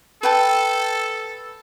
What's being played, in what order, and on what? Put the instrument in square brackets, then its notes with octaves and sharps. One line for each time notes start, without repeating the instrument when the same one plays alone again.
[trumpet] A4 [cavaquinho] B4 G5 A5